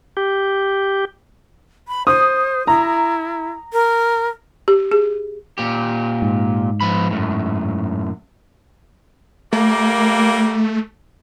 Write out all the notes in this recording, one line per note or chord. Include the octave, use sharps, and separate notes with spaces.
G4
B5
C5 D#6
E4 A#5
A#4
G4
G#4
A#2 G4
G#2
F3 B3 B5
F#2 A2
G3 A3 A#3